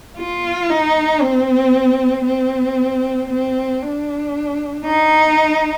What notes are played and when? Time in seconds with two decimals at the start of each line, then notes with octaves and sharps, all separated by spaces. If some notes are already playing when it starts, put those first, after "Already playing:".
0.17 F4
0.70 D#4
1.21 C4
2.25 C4
3.30 C4
3.82 D4
4.85 D#4